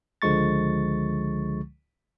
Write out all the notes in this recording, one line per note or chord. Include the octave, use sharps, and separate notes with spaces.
C#2 D3 F3 G#3 C#6 A6